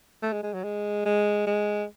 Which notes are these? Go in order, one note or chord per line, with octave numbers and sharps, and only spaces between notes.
A3
G#3
G#3
F#3
G#3
G#3
G#3